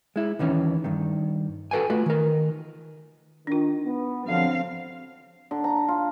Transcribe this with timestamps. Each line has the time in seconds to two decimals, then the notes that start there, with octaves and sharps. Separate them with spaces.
0.16 G#3 E4
0.39 D#2 D#3 E3 C#4
0.84 G2 D#3
1.71 F#4 A4 B4 G5 G#5
1.90 A3 F4 F#4 B4
2.06 D#3 A#4
3.47 D#3 D4 F4
3.85 B3
4.26 G2 D3 F3 F#3 C4 F5
5.51 D3
5.64 A#5
5.88 F4